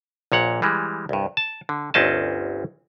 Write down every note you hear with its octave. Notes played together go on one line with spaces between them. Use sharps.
A#1 A#2 C#5 F#5
E3 G3 G#3
C2 G2
A5
D3
G1 D2 C4 C#4 D#5 A5